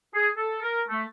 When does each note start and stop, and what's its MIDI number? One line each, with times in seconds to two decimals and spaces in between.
0.14 0.29 68
0.37 0.58 69
0.62 0.80 70
0.89 1.02 57